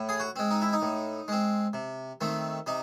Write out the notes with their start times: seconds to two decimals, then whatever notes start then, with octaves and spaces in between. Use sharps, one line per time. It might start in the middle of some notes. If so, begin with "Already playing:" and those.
Already playing: A2
0.09 G#4
0.20 F#4
0.36 G#3 C4
0.51 D#4
0.62 E4
0.73 D#4
0.82 A2
1.28 G#3 C4
1.73 C3
2.21 D#3 A3 C4
2.67 C3 D#4